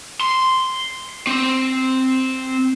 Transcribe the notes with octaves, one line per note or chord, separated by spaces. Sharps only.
C6
C4